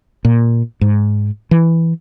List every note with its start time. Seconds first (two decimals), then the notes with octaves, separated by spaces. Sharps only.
0.25 A#2
0.81 G#2
1.51 E3